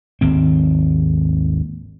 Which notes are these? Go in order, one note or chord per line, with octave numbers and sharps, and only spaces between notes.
G#1 D#2 C4